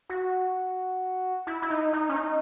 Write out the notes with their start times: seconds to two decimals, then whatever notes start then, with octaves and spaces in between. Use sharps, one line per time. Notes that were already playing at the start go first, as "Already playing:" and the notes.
0.09 F#4
1.47 E4
1.62 E4
1.70 D#4
1.93 D#4
2.09 C#4
2.16 D#4